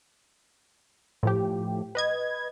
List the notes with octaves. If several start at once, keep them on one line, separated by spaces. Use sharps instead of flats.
A2 F3 G4
B4 D#5 G#6